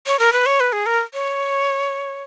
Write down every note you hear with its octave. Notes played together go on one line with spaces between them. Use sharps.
C#5
A#4
B4
C#5
B4
G#4
A#4
C#5